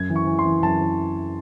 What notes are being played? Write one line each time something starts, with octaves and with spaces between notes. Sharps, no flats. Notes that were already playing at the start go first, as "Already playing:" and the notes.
Already playing: F#2 G#6
E3
C#6
E3
C6
E3
F#2 A5
E3